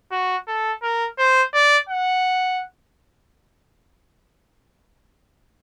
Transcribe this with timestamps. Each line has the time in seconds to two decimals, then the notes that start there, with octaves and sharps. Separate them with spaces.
0.12 F#4
0.48 A4
0.82 A#4
1.18 C5
1.54 D5
1.89 F#5